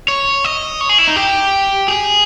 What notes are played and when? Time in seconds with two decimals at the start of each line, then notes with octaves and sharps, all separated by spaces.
0.08 C#5
0.44 D#5
0.81 C#5
0.89 G#4
0.99 E4
1.08 D#4
1.16 G4
1.88 G#4